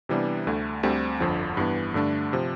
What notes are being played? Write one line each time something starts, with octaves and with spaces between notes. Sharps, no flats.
C3 E3 G3 B3 D4
D2 D3 A3
D2 D3 G3 C4 G4
G1 F2 D3 F3
G2 E3 B3
G2 D3 A3 D4
C3 F3